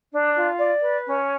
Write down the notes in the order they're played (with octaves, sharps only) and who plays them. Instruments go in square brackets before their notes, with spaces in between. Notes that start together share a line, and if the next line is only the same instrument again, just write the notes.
[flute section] D4
F4
D5
B4
C#4